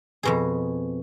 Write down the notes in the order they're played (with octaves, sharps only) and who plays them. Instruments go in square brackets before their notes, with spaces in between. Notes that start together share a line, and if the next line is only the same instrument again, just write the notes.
[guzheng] F2 B2 G#4